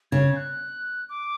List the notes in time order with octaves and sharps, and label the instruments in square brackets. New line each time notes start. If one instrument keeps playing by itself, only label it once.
[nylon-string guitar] C#3 [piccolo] G#6
[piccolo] F#6
D6